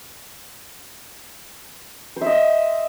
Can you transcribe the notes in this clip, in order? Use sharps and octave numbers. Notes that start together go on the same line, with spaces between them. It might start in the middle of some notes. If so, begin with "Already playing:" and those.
C5 D#5 E5